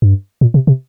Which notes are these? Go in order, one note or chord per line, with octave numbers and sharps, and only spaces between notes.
G2
A#2
C3
C3